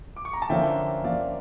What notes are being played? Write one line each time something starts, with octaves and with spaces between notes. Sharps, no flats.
D6
C#6
A#5
A5
D3 F3 A#3 C#4 E5 G5
D3 F3 A#3 C#4 D5 F5